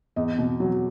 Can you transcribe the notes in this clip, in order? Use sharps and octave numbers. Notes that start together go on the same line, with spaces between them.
E2 D#5
B2
F#3